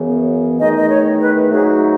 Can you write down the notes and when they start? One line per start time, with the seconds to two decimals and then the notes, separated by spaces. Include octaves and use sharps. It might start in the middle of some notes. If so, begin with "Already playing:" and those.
Already playing: F#2 C#3 E3 B3
0.59 E2 D#3 A3 D#4 D#5
0.78 D#5
0.90 C#5
1.20 B4
1.51 G#2 F#3 A3 D#4 G#4